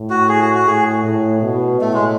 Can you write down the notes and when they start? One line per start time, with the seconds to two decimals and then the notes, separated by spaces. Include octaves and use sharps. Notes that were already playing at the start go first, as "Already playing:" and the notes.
Already playing: A2
0.10 F#4
0.29 G#4
0.41 F#4
0.55 F#4
0.67 A2 G#4
1.05 A2
1.43 B2
1.81 A2 A3
1.93 G#3